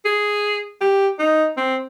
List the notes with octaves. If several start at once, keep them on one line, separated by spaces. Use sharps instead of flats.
G#4
G4
D#4
C4